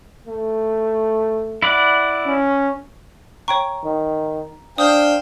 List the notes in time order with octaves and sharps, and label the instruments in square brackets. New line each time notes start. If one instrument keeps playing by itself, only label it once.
[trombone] A3
[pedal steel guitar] E4 D5 F#5
[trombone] C#4
[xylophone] C#5 G5 C#6 [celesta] A#5
[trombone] D#3
[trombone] D4 [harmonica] C5 F5 G5 [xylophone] D#6